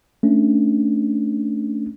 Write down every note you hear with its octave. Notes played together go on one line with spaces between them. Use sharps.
A3 C#4 D4